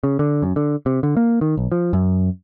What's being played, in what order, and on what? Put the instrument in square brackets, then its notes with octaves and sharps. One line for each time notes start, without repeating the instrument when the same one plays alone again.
[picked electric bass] C#3
D3
F#2
D3
C3
D3
A#3
D#3
B1
F3
F#2